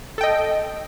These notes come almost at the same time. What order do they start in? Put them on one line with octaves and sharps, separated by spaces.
A4 G5 D#5